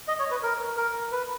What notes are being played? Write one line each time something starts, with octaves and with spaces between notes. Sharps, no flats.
D#5
C#5
B4
A#4
A#4
B4